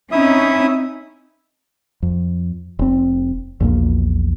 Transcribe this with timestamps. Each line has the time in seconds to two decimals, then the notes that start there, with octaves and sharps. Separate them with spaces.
0.12 C4 C#4 D#4 E4 E5 D#6
2.03 F2
2.79 F1 C4
3.60 A#1 E2 A#2 A#3